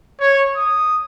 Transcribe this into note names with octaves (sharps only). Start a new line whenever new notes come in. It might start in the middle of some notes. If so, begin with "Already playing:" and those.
C#5
D#6